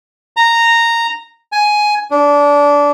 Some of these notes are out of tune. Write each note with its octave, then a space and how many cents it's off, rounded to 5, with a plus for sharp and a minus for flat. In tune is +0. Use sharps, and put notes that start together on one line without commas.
A#5 -10
G#5 +10
D4 -20